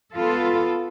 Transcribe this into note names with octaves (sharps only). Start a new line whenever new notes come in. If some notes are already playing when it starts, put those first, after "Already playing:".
B3 F4 A4